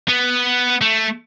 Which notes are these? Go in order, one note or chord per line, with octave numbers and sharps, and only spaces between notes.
B3
A3